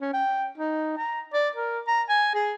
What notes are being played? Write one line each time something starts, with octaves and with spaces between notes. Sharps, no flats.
C#4
G5
D#4
A#5
D5
A#4
A#5
G#5
G#4